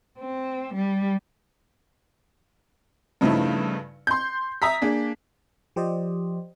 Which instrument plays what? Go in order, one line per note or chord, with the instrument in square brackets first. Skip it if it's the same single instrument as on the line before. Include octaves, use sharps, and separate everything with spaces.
[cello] C4
G3
[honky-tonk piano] G2 C#3 F3 A3 D#4 E4
C6 G6
E5 A#5 D#6 B6
A#3 D4 G#4
[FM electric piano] F3 G4 C5 D5 D#5